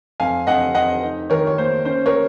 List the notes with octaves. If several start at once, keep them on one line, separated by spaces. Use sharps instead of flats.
F2 F5 G#5
F2 D#5 F#5
F2 D#5 F#5
D#4
D#3 A#4 C#5
C#5
A#3 C5
C#4 C5
A#4 C#5